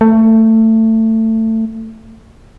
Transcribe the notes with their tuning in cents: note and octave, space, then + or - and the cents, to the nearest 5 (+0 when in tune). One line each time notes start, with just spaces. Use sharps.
A3 +20